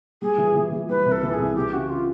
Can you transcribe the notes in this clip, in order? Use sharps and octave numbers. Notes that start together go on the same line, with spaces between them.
G3 G#4
E3
E3
E3
G3 B4
C2
A4
E3
G#4
C2
E3 G4
C#3 F#4
F4